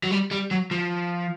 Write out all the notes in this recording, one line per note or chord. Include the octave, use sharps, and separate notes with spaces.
F#3
G3
G3
F#3
F3